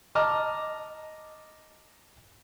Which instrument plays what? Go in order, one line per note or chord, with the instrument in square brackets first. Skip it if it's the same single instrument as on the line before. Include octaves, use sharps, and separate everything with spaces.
[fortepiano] D#5 A5 A#5 D6 F6